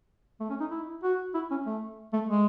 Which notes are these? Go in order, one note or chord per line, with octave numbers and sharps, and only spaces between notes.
A3
C#4
D#4
E4
F#4
E4
C#4
A3
A3
G#3